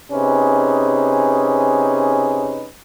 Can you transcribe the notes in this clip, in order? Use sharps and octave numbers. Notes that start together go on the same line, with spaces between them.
C3 C#4 D#4 G#4 B4